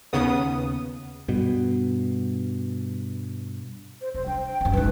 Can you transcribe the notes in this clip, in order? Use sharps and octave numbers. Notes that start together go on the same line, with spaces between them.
D#2 C#3 B3 D#6
G2 B2
C5
C2 C5
D4 G5
F#2 C4
G#1 D#4 B4